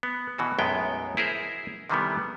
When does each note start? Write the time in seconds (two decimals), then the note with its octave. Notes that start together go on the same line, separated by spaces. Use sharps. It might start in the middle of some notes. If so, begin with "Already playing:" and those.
0.03 B3
0.38 B2 E3 F#4
0.58 B1 F#2 A2 G#3 B3 G5
1.17 E4 G#4 A#4 C5
1.90 C3 D#3 E3 G3 A3 B3